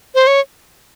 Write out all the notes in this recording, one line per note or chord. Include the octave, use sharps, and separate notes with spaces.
C5
C#5